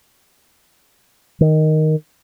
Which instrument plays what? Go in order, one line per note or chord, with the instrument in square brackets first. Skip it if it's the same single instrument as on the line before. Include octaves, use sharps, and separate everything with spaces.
[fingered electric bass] D#3